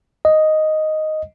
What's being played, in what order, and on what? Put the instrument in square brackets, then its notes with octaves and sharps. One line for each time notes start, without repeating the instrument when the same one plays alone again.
[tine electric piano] D#5